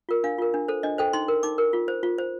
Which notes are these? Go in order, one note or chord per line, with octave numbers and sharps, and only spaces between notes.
F4 A#4
D4 F5
F4 A#4
D4
A4 C5
D4 D#5
A4 C5 G5
D#4 C6
A#4
D#4 D6
A#4
F4
C5
F4
C5